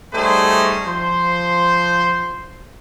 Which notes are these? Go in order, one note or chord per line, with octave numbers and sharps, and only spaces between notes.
G3 A3 C#4 D#4 G#4 C5
F3 C5 C6